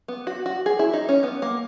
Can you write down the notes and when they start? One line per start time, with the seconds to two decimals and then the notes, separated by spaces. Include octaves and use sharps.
0.08 B3
0.27 F#4
0.46 F#4
0.66 G#4
0.79 E4
0.94 D#4
1.09 C#4
1.23 B3
1.42 A#3